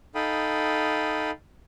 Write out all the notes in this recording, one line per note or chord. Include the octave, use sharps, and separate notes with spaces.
D#4 A4 F5 G5 B5 D#6